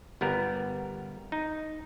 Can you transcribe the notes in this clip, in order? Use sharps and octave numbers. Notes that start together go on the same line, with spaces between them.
G1 G3 B3 A#4
D#4